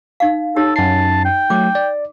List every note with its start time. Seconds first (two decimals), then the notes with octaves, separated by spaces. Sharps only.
0.20 D#4 F5
0.56 D#4 G4 A4 C#5
0.76 F#2 A5 C7
1.25 G5
1.50 F#3 A3 D6
1.75 D5